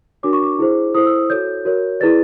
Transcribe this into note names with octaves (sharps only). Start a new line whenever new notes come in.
D4 F#4 A#4 C#5 D6
C#6
D6
E4 G#4 C5
E4 A4 C5 D#6
E6
F#4 A4 C#5 G6
F#4 A#4 C#5
E4 G#4 B4 D5 A6